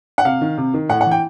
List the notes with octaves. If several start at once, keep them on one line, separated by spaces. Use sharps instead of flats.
F#5
C3 F5
D#3
C3
D#3
A2 F#5
F#5
E3
G5